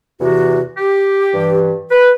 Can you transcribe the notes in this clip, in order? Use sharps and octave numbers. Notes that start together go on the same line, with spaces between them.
E2 C3 E3 F#4
G4
G2 E3
B4